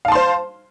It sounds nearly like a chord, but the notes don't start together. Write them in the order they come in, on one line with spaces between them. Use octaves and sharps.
F5 A5 C6 C5